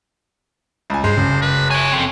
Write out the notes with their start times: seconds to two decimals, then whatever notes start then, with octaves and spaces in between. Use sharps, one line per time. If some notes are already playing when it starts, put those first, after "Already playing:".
0.90 C#2 G#5
1.04 G2 G#3 C5
1.17 F#1 C#3
1.42 B4
1.70 C#5 E5 G#5
1.91 C4 A4